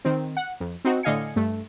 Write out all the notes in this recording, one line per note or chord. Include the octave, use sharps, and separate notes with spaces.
D#3 C4
F#5
F2
C4 D#4 F#4
A2 D3 D#5 F5 G#5 C#7
G2 A3